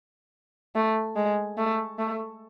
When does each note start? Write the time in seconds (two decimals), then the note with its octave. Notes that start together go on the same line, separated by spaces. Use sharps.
0.75 A3
1.16 G#3
1.58 A3
1.99 A3